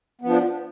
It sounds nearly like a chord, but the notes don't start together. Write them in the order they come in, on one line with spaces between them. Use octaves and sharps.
B3 F3 D4